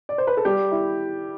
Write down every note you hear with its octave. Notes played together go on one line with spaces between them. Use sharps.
D5
C5
B4
A4
G3 G4
E4